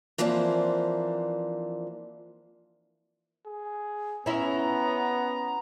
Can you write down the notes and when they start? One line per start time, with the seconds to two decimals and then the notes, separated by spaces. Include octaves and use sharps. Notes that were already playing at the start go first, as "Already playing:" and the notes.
0.18 E3 F3 A#3 C4 D4
3.46 G#4
4.26 B3 C#4 E4 A#5